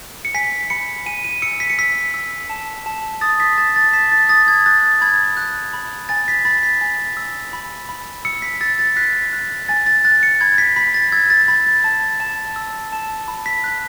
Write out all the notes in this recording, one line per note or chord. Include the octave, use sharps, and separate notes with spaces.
C#7
G#5 B6
B5 C#7
G#5 D#7
D#7
E6 C#7
B6
C#7
E6 B6
E6
A5
A5
D#6 A6
B6
A5 A6
A6
A5 B6
A6
D#6 A6
G#6
F#6 A6
B5 G#6
F#6
B5
G#5 A6
B6
B5 A6
B6
G#5
E6
B5
B5
E6 C#7
B6
E6 A6
A6
F#6 B6
F#6
G#5 A6
A6
F#6 A6
C#7
B5 G#6
B6
B5 B6
A6
E6 G#6
A6
B5 A6
A6
A5
A5
E6
A5
B5
B6
F#6